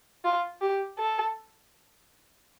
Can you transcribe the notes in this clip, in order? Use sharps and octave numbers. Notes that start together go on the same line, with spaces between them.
F4
G4
A4